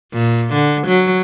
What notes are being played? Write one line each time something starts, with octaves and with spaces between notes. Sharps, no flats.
A#2
D3
F#3